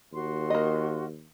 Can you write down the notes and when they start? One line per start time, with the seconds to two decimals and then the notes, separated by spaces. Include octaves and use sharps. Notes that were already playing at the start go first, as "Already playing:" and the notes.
0.13 D#2 F#4 C6
0.50 A#3 D#5